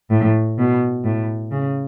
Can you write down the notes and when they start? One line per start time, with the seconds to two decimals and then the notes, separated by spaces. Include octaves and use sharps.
0.10 A2
0.58 B2
1.04 A2
1.51 C#3